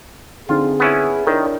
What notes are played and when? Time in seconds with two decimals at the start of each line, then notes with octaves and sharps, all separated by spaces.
0.49 D3 C4 D#4 F4 G#4
0.80 B3 C#4 E4
1.27 D#3 D4 E4 A#4 C#5